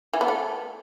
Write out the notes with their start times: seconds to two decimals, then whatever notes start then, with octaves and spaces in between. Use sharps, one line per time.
0.13 E3
0.21 B3
0.28 A3